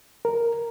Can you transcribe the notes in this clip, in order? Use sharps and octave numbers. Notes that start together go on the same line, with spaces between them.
A#4